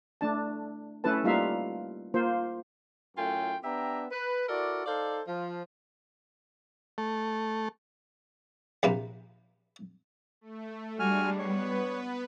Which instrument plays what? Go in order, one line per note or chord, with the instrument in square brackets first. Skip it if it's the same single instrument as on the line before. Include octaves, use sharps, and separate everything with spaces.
[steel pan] A3 D4 A5
A3 C#4 E4 A4 B4 A5
G3 A#3 D#4 F4 E5 F5
A#3 F4 C5
[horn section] F#2 A2 A3 F4 G5 G#5
B3 D4 G4 E5 G5 A#5
B4
E4 F#4 A4 A#4 D5
D#4 A4 C5 D5 F5
F3
[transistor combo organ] A3
[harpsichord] A#1 C3 A#3 B4
[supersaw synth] A3
[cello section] G3 [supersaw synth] G#3 D4 [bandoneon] F#4 G#5 F6
[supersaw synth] B3 B4 [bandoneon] C#5